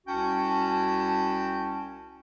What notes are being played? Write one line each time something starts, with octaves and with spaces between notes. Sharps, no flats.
C2 C#4 F#4 G5 A5